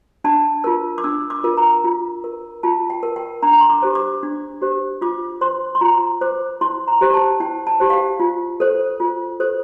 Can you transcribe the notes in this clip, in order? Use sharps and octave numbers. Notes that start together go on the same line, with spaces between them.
D4 A5
F4 A#4 E6
D6
D4 E6
D6
F4 A#4
A#5
F4
A#4
F4 A5
G5
A#4
G5
D4 A#5
A#5
C6
D6
G4 C5
D6
D4
G4 C5
F4 D6
C5 C6
C6
F4 A#5
C5 D6
E4 C6
A#5
G4 C5
A5
E4 G5
A5
G4 C5
F5
G5
F4
A4 C5
F4
A4 C5